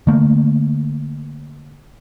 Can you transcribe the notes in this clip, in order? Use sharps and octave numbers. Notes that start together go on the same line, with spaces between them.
D3 A3 A#3